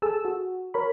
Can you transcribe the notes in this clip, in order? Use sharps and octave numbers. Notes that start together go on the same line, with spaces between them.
G#4 A4 A5 E6
F#4
A#4 C#5 B5